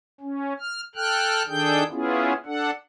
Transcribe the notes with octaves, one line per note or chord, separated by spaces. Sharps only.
C#4
F6
A4 G5 F6 F#6
D#3 D4 G#4 A4 G5 G6
B3 C#4 E4 F4 G#4
D4 A4 F#5